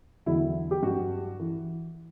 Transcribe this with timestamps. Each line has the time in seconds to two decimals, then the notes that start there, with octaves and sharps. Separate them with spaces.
0.26 E2 D3 F#3 E4
0.71 G4
0.82 G2 F#3 F#4
1.39 E3